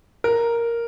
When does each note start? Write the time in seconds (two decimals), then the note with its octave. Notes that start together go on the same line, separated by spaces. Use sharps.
0.24 A#4